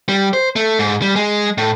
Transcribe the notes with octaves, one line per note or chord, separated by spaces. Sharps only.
G3
C5
A3
G#2
G3
G#3
A2